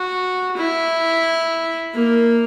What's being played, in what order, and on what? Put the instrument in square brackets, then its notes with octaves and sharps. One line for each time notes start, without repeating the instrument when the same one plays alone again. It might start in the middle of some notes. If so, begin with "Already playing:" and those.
Already playing: [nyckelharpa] F#4
E4
A#3